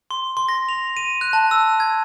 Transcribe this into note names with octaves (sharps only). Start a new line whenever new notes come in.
C6
C6
A#6
F7
D#7
F#6
A5
E6
G#6